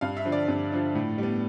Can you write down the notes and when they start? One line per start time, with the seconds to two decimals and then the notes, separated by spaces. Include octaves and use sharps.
0.01 G2 F5
0.17 E5
0.25 D3 F3
0.32 D5
0.48 G2
0.72 D3 F3
0.95 A2
1.18 G3 B3